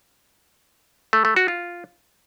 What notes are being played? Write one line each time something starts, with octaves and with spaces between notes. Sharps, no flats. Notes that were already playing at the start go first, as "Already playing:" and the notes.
A3
A3
F#4
F4